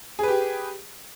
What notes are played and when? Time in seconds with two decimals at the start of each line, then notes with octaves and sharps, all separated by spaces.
0.19 G#4
0.23 B4
0.28 G4